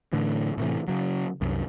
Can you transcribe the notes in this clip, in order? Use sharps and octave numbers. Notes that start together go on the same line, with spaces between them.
A2 D3 E3
A2 C3 E3
C#3 F#3
C2 F#2